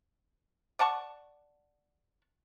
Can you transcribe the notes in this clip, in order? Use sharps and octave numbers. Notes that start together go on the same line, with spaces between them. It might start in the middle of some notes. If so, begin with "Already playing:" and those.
D5 F#5 A5 C#6